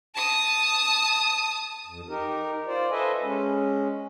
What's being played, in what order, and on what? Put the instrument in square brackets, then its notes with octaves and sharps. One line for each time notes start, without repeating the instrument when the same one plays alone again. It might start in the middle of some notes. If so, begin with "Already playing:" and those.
[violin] A5 D#6
[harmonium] F2
D#4 G4 A#4
F4 C5 D5
A4 B4 C5 D#5 E5 G#5
G#3 C#4